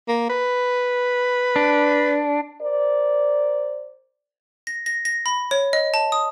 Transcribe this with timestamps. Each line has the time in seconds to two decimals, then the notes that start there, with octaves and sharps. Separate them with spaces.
0.09 A#3
0.30 B4
1.56 D4
2.62 A#4 C5 D5
4.67 A#6
4.86 A#6
5.05 A#6
5.26 B5
5.51 C#5
5.73 D#5
5.94 A5
6.12 D#6